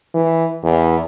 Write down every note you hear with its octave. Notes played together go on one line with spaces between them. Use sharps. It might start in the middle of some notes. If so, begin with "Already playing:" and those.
E3
E2